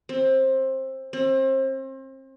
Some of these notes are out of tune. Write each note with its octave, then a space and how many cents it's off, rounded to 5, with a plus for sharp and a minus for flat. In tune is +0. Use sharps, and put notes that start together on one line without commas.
C4 +20
C4 +35